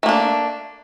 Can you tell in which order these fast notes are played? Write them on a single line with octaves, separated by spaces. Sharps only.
A3 A#3 D4